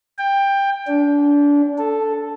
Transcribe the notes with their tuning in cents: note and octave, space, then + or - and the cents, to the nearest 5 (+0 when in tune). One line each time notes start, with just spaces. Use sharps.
G5 +15
D4 -25
A4 +0